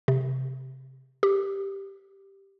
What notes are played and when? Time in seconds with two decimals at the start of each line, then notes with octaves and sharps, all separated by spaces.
0.08 C3
1.23 G4